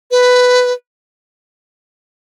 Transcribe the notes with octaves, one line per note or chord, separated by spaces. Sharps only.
B4